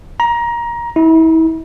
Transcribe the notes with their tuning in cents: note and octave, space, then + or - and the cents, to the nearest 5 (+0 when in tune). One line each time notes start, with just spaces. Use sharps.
A#5 +20
E4 -35